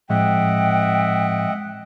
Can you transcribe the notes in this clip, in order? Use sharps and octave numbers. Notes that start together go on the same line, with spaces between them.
F2 A2 G#3 D#5 E5 F#5 G5